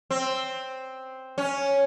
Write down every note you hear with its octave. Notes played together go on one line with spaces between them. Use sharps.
C4
C#4